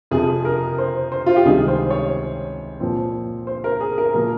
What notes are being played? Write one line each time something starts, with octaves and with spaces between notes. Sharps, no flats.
F2 C3 F3 G#4
A#4
C5
C5
F4
G4
C#2 C3 D#3 G3 G#4
C5
C#5
A#2 F3 C4
C5
A#4
G#4
A#4
A#2 F3 A#3 A#4